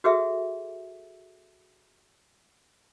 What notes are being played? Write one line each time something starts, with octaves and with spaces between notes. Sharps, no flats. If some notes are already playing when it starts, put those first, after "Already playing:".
F#4 G#4 A4 E5